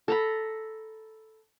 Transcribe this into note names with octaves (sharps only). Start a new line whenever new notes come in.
A4 A#5 B5